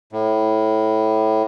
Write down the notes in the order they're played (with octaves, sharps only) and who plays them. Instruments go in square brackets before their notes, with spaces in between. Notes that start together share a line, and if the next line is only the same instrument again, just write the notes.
[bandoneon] A2